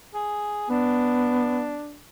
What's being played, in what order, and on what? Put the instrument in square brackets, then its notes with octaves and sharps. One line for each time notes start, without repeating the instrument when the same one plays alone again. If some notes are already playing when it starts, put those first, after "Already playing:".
[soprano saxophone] G#4
[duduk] B3 [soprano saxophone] D4